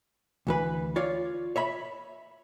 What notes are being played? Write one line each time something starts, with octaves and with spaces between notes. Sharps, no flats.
D2 E3 B4
F4 C#5 D5
C#5 E5 B5